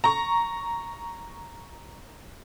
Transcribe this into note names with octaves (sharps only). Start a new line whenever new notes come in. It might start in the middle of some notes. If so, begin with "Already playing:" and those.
A#5 C#6